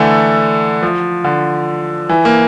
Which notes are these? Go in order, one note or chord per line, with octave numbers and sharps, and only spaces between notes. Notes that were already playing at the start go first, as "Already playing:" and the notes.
Already playing: D3 E3 A3
F3
D3
E3
A#3